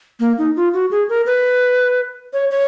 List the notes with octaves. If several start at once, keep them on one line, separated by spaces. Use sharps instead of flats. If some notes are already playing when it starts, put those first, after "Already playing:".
A#3
D#4
F4
F#4
G#4
A#4
B4
C#5
C#5